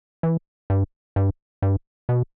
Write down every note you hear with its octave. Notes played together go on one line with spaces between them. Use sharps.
E3
G2
G2
G2
B2